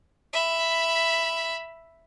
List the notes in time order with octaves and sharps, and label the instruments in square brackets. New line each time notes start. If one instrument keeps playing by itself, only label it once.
[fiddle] E5 B5